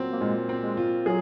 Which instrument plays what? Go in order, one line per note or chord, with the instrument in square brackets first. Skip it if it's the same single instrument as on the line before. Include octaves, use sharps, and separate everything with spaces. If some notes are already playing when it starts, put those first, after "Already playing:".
Already playing: [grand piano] A#2 F#3 C4
[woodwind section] A#3
[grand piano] A#2 [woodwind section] G#3
[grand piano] C4
[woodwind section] G#3
[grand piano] F4
[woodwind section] F#3 [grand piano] G#4